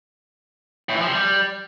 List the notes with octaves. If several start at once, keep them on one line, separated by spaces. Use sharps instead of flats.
A2
E3
F3
C3
G3